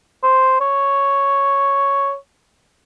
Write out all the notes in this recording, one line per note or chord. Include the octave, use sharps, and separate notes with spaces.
C5
C#5